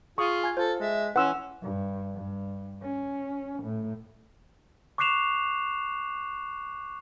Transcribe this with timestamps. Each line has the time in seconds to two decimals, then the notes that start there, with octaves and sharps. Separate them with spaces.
0.18 F4 G#4 C#6 D#6
0.44 G#5 G#6
0.57 F4 A4 C5
0.80 G#3 E5
1.16 E3 C#4 B4 F#5 C6 E6
1.62 G2
2.15 G2
2.82 C#4
3.64 A2
4.98 C#6 D6 F#6 C7 E7 F7